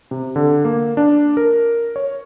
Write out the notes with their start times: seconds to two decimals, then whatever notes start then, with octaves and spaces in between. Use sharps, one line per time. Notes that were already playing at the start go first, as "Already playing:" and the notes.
0.11 C3
0.36 D3
0.65 A#3
0.97 D4
1.37 A#4
1.96 C#5